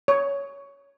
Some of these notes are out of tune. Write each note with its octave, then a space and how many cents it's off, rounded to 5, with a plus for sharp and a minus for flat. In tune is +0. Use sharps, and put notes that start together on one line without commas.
C#5 +15